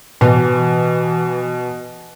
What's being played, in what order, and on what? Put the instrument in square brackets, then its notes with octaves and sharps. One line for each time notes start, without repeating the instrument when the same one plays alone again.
[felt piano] B2 [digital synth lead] E3